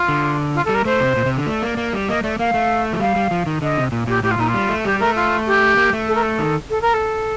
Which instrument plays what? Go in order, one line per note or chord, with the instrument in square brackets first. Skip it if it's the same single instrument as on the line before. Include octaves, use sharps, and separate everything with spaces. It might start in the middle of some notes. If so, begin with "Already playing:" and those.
Already playing: [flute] F4
[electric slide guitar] D3
[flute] F4
A4
[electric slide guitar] G3
[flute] A#4
[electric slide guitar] A3 [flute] C5
[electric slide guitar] C3
A#2
C3
D3
[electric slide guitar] A3 [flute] D5
[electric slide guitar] A#3
A#3
G3
[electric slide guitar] A#3 [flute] D#5
[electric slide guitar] A3 [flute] D5
[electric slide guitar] A#3 [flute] F5
[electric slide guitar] A3
F3
[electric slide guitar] G3 [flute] F5
[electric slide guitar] G3
F3
D#3
[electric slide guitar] D3 [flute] D#5
[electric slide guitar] C3
A#2
[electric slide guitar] A#2 [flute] G4
[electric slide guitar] A2 [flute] G4
[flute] F4
[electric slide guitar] A#2 [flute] D#4
[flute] F4
[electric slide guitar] G3
A3
[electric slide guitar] G3 [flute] G4
[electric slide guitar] A3 [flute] A#4
[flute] F4
G4
[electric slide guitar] A#3
A3
[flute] A4
A#4
A4
[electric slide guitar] D#3
[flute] A4
A#4
A4